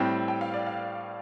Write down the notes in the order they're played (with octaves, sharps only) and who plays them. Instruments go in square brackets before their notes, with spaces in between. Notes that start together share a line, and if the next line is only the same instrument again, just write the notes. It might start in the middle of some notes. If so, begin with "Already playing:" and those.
Already playing: [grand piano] A2 G3 C4 [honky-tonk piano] G5
[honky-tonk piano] G5
F5
D5
F5